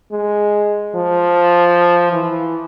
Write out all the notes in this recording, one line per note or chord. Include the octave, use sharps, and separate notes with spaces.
G#3
F3
E3